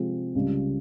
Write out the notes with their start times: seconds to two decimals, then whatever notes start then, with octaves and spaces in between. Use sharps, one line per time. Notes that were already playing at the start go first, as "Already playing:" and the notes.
Already playing: C3 F3 G#3 C4
0.35 C#2 C#3 G3